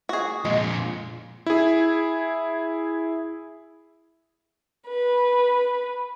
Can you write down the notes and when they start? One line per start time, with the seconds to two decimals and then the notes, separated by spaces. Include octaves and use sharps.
0.09 F#4 G#4
0.45 F2 A#2 G#3
1.46 E4 G#4
4.87 B4